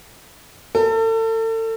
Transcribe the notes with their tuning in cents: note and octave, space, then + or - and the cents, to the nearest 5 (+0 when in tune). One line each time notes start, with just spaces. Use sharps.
A4 +35